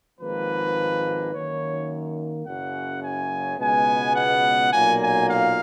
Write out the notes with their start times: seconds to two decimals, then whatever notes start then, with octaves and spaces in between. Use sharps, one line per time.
0.19 G#1 G#2 F3 A#3 B4
1.32 F#2 D#3 A#3 D#4 C#5
2.45 F#1 F#2 C#3 F#5
3.02 G#5
3.59 C#2 B2 G#3 B3 G#5
4.15 F#5
4.72 B1 A#2 F#3 A#3 F4 G#5
5.00 G#5
5.29 F5